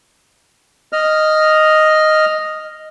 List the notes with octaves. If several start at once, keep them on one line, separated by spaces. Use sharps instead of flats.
D#5 F6